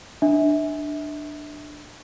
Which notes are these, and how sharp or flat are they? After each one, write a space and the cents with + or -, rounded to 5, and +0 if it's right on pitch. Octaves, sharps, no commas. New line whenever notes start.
D4 +15 E5 -30